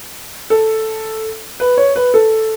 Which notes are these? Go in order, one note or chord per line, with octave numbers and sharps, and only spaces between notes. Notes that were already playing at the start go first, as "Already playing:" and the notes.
A4
B4
C#5
B4
A4